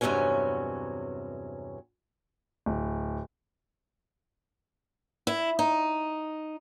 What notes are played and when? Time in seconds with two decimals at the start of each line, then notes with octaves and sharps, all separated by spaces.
0.01 E2 G2 C3 F#3 C#4 G#5
2.66 D1
5.27 E4
5.59 D#4